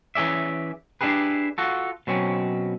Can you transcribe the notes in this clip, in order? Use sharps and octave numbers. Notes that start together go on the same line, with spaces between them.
E3 C#4 G#4 D5 E5
D4 E4 G4 G#4 B4
F4 F#4 A4
B2 F#3 C4 C#4